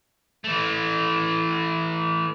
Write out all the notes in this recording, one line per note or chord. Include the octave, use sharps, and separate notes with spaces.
E3 A3